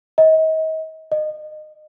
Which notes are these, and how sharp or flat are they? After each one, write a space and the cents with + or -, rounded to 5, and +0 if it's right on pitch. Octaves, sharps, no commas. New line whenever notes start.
D#5 +35
D#5 -25